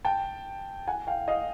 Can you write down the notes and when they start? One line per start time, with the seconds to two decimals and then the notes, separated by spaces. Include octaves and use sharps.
0.05 G5 A5
0.87 F#5 G#5
1.07 F5 G5
1.28 D#5 F5